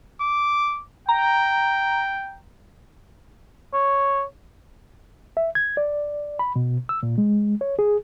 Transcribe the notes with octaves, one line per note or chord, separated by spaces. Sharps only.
D6
G5 A#5
C#5
E5
G#6
D5
B5
B2
E6
A#2
G#3
C#5
G#4